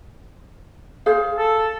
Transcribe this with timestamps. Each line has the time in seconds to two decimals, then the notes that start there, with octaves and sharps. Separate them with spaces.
1.06 G#4 C5 F5
1.38 A4